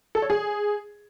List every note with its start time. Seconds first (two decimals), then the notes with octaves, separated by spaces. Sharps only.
0.15 A4
0.22 C#5
0.30 G#4